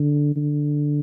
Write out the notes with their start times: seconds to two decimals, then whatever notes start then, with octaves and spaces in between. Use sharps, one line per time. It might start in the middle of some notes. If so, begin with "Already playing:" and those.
Already playing: D3
0.36 D3